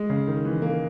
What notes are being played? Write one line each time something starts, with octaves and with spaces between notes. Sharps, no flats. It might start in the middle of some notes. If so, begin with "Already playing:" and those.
Already playing: G#3
C#3
D#3
E3
A#3